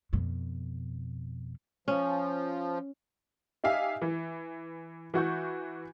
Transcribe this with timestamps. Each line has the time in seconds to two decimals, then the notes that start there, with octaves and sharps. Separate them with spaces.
0.13 F2 B2
1.88 F3 C#4
3.64 D#4 G4 E5 F5 G#5
4.02 E3
5.14 E3 F#4 C#6 G6